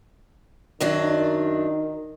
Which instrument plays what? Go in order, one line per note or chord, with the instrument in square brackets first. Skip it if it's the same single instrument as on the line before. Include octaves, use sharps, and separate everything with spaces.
[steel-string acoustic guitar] F#2 F#3 D4 [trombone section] D#3